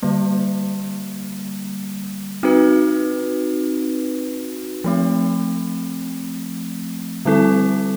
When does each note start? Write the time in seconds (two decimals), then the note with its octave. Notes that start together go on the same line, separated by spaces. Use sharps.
0.02 D3 G3 A#3
2.43 C4 D#4 F#4 B4
4.84 F3 A3 C4
7.25 D3 G3 C4 E4 A4